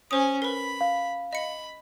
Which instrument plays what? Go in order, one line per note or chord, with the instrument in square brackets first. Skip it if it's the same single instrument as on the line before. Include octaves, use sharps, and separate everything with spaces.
[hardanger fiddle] C#4 G#5 [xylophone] C5 D#6
[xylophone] A#4 B4 [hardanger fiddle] B5
[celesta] F5
[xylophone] D#5 C#7 [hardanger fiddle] B5